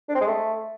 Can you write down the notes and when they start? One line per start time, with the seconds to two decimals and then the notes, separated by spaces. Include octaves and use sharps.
0.09 D4
0.15 C4
0.21 G#3
0.27 A3